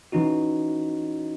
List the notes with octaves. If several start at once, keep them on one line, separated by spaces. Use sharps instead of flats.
E3 C#4 D#4 F#4